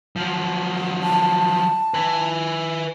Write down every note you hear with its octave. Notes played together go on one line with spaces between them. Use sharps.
F3 F#3
A5
B4 G#5